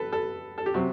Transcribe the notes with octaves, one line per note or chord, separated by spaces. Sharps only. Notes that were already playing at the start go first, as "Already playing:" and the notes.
Already playing: A4 B4
A4
A4
G4
C3 F#3 C4 F#4